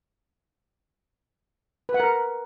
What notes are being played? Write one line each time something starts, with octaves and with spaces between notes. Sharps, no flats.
B4
F#5
A#4